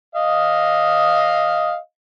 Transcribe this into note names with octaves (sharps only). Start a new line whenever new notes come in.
D#5 F5